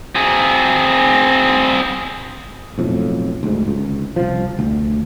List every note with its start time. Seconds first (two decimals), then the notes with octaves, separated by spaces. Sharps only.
0.15 C4 G#4
2.78 B1 F2 A2
3.43 D2 G#2
3.68 C#2
4.16 C2 F3
4.59 D2